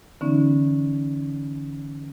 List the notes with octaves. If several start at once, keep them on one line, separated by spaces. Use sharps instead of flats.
D3 E3 B3 C#4 D#4